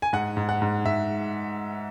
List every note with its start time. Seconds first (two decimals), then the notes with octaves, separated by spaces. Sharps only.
0.02 G#5
0.13 G#2 F#5
0.37 G#2
0.49 F#5
0.62 G#2
0.85 G#2 E5